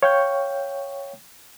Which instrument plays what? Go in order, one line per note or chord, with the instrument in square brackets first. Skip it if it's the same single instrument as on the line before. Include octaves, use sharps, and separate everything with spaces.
[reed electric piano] C#5 F5 G5 C#6 G6